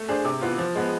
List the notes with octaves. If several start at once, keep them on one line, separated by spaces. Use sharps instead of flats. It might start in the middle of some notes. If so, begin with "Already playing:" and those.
Already playing: A3
D4 G#4 C5
C3
E3 B3 F4
F3
G#3 B3